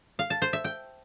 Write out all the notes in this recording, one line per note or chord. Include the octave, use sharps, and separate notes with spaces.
F5
A5
C5
E5
G5